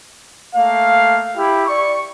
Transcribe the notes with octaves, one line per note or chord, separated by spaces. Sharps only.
A3 A#3 F5
E4 G4
D5 C#6